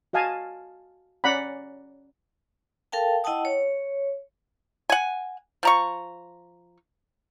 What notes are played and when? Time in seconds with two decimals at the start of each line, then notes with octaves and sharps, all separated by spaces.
0.13 F#4 D#5 F5 G#5 A5
1.24 C#4 D5 F#5 A#5 B5
2.92 A4 A#4 F5 G5 A5
3.24 E4 D#5 F#5 G5 A5 D#6
3.45 C#5
4.90 F#5 G#5
5.63 F3 A#5 C#6